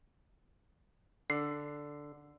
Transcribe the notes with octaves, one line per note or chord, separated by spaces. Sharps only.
D3 C7